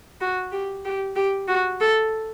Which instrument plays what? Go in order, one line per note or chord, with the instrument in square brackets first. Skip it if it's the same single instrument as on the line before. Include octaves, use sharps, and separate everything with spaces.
[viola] F#4
G4
G4
G4
F#4
A4